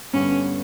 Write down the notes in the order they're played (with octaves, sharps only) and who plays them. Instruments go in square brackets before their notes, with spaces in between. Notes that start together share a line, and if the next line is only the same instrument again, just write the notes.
[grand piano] G2 D3 G3 B3 [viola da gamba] C#4